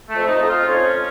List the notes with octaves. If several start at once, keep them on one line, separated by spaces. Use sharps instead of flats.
A3
F2
D#4
F2
F4
F2 C#4